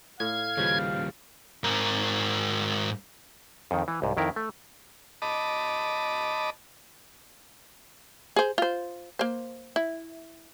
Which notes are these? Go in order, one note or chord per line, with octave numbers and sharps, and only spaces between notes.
A2 F5 G#6
D#2 C#3 F3 G3 B4
G#2 A#4
F2 D#3
E3
C2 G#2
F2 D#3 E4 A#4
A3
D#5 A5 B5 D6
G#4 C5
F4 C5
A#3 C5
E4